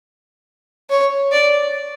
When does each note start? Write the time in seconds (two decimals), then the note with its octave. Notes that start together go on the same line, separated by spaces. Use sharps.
0.90 C#5
1.32 D5